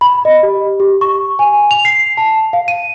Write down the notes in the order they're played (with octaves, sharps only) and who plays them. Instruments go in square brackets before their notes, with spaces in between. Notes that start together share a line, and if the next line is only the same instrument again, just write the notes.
[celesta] B5
D#5
G4
G4
C#6
G#5
F7
C7
A5
F5
D#7